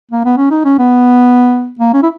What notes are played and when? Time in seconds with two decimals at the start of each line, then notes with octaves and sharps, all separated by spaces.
0.11 A#3
0.25 B3
0.37 C#4
0.50 D#4
0.65 C#4
0.78 B3
1.79 A#3
1.93 C#4
2.02 E4